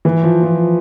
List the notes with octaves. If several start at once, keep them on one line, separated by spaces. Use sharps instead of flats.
E3
F3
F3